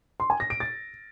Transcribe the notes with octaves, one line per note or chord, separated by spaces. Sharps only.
C6
G#5
A#6
D7
A6